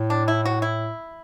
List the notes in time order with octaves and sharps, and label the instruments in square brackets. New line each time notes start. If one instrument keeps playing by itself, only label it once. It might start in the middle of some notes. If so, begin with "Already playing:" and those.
Already playing: [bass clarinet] A2
[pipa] D4
E4
F#4
E4